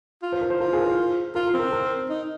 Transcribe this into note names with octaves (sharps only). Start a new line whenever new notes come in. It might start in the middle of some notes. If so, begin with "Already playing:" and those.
F4
C5
A#4
C5
F4 A#4
G#4
A#4
C5
F4 A#4
A#4
C4
A#4
A#4
D#4